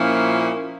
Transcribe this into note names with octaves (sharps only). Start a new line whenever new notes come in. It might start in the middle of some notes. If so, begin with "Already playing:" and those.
Already playing: A#2 F3 A#3 C#4 E4